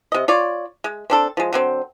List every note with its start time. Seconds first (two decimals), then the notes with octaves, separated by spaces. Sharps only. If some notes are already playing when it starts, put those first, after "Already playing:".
0.12 C3 D#5
0.28 F4 C#5 D5
0.84 G#3
1.10 C4 D4 A4
1.37 F3 G#3
1.53 D3 F#3 C4